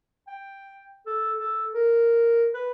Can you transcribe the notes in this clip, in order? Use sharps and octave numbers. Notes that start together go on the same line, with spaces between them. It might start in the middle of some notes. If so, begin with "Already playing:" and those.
G5
A4
A4
A#4
B4